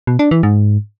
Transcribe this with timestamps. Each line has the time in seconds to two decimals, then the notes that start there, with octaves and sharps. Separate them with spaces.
0.07 B2
0.19 D4
0.31 E3
0.43 G#2